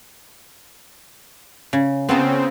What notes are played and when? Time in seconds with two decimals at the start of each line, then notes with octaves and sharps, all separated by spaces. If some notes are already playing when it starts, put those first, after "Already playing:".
1.73 C#3
2.09 C#3 B3 C4 F4 A5